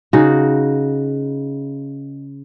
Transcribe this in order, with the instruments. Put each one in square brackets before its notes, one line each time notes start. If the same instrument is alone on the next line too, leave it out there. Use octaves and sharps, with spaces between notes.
[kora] C#3 D#4 F#4